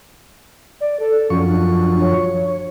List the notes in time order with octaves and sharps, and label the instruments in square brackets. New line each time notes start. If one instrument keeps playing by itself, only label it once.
[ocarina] D5
A4
[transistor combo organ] F#2 F3 C#6 [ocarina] C#4
[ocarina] D4
C#5